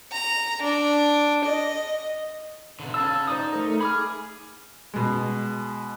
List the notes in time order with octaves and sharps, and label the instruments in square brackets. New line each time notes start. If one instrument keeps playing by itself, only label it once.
[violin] A#5
D4
D#5
[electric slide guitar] B2 D3
[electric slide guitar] C#3 F5 [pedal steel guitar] A5 E6
[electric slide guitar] D#4 [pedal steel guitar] C5 D5 D#6
[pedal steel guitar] A3 A#4
[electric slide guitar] G#4 [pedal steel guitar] B5 D6 F6
[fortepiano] B2 G#3